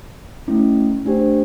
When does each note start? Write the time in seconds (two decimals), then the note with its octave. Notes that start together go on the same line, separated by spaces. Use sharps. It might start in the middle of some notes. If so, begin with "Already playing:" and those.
0.48 A3 C#4 E4
1.05 A3 D4 G4 C5